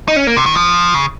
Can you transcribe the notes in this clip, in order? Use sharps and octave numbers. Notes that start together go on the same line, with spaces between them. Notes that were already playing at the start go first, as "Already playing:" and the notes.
D#4
C#4
A#3
C3
D#3
F3
C#3